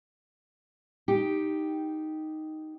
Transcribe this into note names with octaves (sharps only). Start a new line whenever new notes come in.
D#4 G4